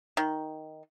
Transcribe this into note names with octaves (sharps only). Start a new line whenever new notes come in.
D#3